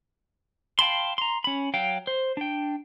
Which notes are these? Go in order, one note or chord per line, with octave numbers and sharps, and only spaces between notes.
F5 G5 A5 B5 C6
A#5 C6
C#4 B5
F#3 F5 G5
C5
D4 G5